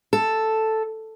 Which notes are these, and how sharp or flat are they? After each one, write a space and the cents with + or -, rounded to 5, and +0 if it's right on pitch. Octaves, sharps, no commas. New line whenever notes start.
A4 +0